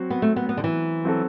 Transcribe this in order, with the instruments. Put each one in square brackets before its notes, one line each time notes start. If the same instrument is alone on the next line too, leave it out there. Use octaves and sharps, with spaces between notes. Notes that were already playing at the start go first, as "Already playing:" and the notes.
Already playing: [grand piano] F#3 C4 F#4
[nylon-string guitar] B3
A3
B3
B3
D3
E3
[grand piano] F#3 C4 F#4 A4